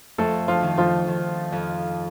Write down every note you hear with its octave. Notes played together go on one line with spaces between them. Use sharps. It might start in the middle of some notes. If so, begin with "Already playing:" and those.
F2 A3 A4
F3 F4
D#3
F3 F4
D#3
F2